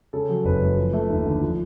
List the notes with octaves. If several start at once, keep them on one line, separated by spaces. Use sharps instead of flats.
C#3 A4
F#3
F#1 B4
F#2
F3
A3
D#2
D3
F3